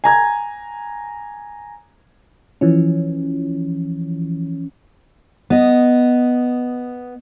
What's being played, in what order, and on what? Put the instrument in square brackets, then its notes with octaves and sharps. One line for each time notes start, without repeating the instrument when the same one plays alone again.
[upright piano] G#5 A#5 G#6
[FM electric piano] E3 F3 C#4
[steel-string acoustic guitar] B3 D#5